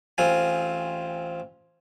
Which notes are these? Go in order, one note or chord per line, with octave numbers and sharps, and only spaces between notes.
A1 C4 F4 G#5